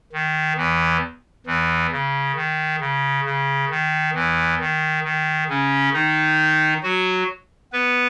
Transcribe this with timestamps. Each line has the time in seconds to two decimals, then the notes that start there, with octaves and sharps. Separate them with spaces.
0.13 D#3
0.57 E2 E3
1.46 E2 E3
1.92 C#3
2.35 D#3
2.80 C#3
3.25 C#3
3.70 D#3
4.14 E2 E3
4.60 D#3
5.04 D#3
5.49 C#3 C#4
5.93 D#3 D#4
6.83 F#3 F#4
7.73 B3 B4